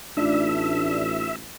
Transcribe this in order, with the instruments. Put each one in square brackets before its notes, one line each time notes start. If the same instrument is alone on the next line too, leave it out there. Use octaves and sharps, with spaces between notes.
[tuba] A1 [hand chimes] A3 D#4 F4 [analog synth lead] D4 [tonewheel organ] E5